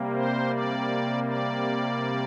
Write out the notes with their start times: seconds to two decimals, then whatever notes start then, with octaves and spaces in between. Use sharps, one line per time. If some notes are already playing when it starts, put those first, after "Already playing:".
Already playing: C3 G3 A#3
0.13 C5
0.50 D5
1.24 D5